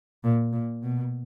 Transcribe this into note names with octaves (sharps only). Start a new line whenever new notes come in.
A#2
A#2
B2